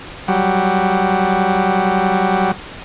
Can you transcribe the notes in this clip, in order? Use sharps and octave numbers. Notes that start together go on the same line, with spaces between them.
F#3 G3